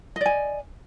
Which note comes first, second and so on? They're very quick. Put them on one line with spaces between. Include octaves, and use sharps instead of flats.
D#5 D5 G#5